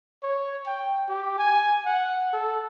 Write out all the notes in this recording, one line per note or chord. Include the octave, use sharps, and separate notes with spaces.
C#5
G5
G4
G#5
F#5
A4